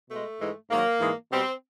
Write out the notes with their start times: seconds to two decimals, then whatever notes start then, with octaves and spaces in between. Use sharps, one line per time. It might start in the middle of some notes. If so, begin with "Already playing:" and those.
0.10 B2 G#3 A3
0.40 G#2 E3 G#3
0.70 G#2 D#3 F#3 A#3
1.00 G#2 E3 G#3
1.31 B2 G3 C4